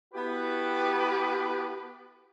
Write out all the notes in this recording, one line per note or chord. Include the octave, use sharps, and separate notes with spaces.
B3 E4 F#4 G4 A4 B4